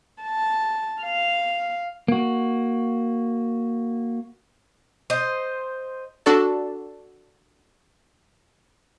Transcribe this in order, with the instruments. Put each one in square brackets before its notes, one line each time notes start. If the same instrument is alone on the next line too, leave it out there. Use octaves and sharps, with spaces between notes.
[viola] A5
F5
[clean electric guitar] A#3 F#4
[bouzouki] C5 D#5
[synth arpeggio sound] D4 F#4 A4 D5 A5